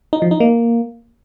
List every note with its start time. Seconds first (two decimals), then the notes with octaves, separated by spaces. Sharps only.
0.13 D#4
0.22 F3
0.31 D#4
0.40 A#3